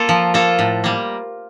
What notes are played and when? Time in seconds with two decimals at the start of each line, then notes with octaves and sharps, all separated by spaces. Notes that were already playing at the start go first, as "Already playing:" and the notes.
Already playing: A#3 F4 A4
0.09 F3
0.34 A#3 F4 A4
0.59 A2
0.84 G3 A#3